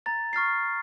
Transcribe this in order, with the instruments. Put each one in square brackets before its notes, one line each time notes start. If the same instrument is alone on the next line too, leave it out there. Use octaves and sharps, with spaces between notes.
[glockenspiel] A#5 A6
C#6 F6 A6 C7